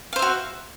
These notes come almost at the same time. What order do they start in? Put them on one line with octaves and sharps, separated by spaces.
F5 C5 E5 F#4